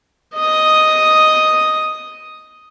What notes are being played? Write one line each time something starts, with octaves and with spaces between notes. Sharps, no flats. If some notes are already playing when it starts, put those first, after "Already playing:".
D#5 D#6